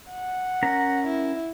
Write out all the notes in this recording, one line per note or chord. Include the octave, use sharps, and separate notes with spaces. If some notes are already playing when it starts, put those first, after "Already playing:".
F#5
C#4 A#4 A#5
E4